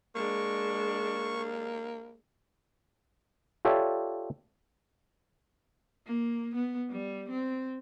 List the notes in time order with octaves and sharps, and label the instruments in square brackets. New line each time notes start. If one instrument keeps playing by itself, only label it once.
[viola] G#3 D4 [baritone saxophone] A#3 [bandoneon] C#6
[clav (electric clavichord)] F4 G4 A4 C#5 D5 E5
[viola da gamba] A#3
B3
G3
C4